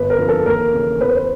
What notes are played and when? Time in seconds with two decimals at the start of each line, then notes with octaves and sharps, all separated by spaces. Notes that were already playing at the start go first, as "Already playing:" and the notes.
Already playing: G1 B4
0.10 A#4
0.18 F2 D3 F3
0.28 A4
0.46 D#2 A#4
0.73 C#3 E3
1.00 E2 B4
1.09 C5
1.16 B4